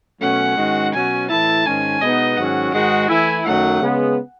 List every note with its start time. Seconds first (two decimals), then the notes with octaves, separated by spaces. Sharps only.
0.21 B2 F#3 A3 C#4 F#5
0.57 G#2 D#3 G#3 C#4 F#4
0.93 B2 F#3 C#4 F#4 G#5
1.30 A2 E3 A3 E4 A5
1.66 G#2 D#3 G#3 C#4 G#5
2.01 B2 G#3 B3 D#4 D#5
2.37 G#2 D#3 F#3 C#4 F#4 F#5
2.73 G#2 D#3 G#3 D#4 F#4 F#5
3.09 E3 A3 E4 G#5
3.46 F#2 D#3 F#3 A3 D#4 F#5
3.81 C#3 G#3 B3